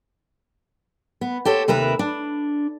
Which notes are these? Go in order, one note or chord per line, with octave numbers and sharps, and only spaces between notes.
B3
G4 A4 C5 C#5
D#2 C3 A#4 B4 E5
D4